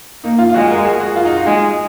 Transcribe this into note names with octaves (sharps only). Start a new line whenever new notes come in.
A#3 D#4
F4
F4
G#3 F#4
A#4
G#4
F#4
F4
D#4
D#4
G#3